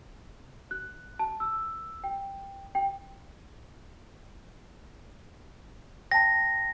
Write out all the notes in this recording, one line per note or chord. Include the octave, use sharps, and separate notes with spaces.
F#6
A5
E6
G5
G5
G5 A5 A#6